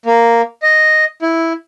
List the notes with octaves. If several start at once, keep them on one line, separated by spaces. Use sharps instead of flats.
A#3
D#5
E4